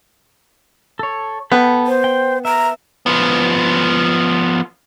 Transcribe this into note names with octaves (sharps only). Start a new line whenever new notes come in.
A4 C#5
B3 A4 G5 B5
C5
G5
E5 A#5
F3 B3